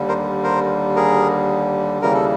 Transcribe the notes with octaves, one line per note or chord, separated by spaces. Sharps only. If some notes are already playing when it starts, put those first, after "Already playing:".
Already playing: D#2 D3 G3
A#4 C5
A#4 C5
G#4 A#4
D#2 C#3 E3 G3 A#4
A4